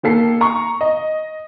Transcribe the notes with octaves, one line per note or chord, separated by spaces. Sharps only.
D#3 A#3 A4 C7
A#5 C#6
D#5